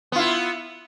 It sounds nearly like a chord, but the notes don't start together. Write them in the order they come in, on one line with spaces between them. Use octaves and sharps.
B3 F4 E4